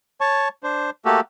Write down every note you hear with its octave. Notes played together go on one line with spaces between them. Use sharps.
C#5 A5 C#6
D4 C5
A3 A#3 F#4 G4 A4